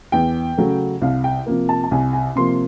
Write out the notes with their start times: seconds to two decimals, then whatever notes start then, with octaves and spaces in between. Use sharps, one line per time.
0.12 E2 G5
0.58 C#3 F#3 A3
1.02 C2 F5
1.24 G5
1.46 C3 F3 A#3
1.69 A5
1.84 A5
1.91 C2 G#5
2.13 G#5
2.36 C3 F3 A#3 C6